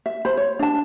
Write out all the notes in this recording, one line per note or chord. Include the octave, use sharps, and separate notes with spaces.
E5
C5 B5
C#5
D4 A5